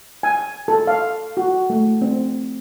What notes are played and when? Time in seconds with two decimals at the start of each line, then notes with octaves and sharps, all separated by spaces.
0.23 G#5
0.68 A4
0.87 F5
1.37 F#4
1.70 A3
2.02 C4